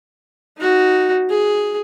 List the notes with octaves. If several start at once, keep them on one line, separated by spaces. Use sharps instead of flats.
D#4 F#4
G#4